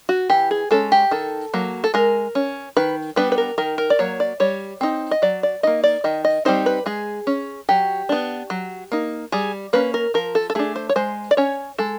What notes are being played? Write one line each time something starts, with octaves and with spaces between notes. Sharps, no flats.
F#4
E3 G4
G#4
G#3 C#4 A4
G4
D#3 A4
F#3 A#3
A4
G#3 A#4
C#4
D#3 B4
G3 B3 D4 B4
B4
A#4
D#3 A#4
A#4
D5
F#3 A#3 C#5
D5
G3 C#5
C4 D#4
D#5
F#3 D5
D5
A#3 D#4 D#5
D5
D#3 D#5
D#5
G3 C4 D#4 C5
B4
G#3 G#4
C#4
F#3 G4
B3 D4
F#3
A#3 D#4
G3 G#4
A#3 C#4 B4
A#4
F3 A#4
A4
A4
A3 D4 G#4
C5
C#5
G#3 C5
D5
C#4 C#5
G#3 A4